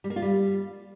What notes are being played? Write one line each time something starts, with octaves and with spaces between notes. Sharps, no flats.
G3
A#3
F4
G3